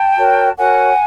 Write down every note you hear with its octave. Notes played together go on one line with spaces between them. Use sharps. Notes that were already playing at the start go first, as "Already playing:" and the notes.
Already playing: G5 A5
F#4 A#4 C#5
F#4 A#4 C#5 F#5 G#5